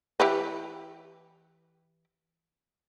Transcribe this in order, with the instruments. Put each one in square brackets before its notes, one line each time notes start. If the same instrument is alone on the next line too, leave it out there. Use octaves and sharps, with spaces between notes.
[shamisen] E3 G4 B4